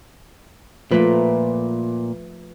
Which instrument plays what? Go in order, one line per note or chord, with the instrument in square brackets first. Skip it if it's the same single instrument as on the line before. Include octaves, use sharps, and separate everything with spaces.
[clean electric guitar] A#2 [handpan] F3 A3 [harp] B4